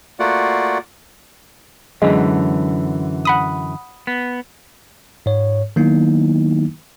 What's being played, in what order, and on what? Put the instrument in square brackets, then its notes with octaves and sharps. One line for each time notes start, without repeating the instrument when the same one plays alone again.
[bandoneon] A3 A#3 F4 F#4 D5 F#5
[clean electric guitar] F#2 D3 E3 [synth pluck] G#3
[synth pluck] F#5 B5 D#6
[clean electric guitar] B3
[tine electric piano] G#2 C#5
D#3 F#3 A#3 B3 D#4 E4